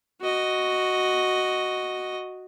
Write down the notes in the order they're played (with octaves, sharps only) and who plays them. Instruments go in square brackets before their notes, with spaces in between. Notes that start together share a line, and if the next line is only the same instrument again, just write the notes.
[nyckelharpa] F#4 D#5